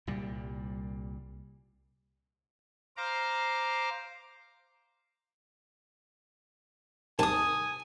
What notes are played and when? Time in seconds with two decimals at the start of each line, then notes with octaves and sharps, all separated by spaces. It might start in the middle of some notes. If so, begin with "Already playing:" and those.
0.07 C2 A#2 G3
2.97 C5 F5 A#5 D6
7.19 D#2 C3 D#3 G#5 A5 D#6